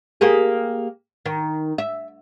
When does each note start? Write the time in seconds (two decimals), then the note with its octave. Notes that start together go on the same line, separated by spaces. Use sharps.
0.21 A#3 G4 G#4
1.26 D#3
1.78 E5